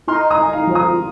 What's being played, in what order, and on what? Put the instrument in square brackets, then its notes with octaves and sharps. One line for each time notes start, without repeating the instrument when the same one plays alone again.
[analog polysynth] D#4 [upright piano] C6 F6
[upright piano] A#5 D#6
[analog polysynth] D#4 [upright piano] G#5
[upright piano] F5 A#5
[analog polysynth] F3
[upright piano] A#5 D#6